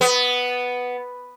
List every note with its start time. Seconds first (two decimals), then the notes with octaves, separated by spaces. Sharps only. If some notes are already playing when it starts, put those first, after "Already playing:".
0.01 B3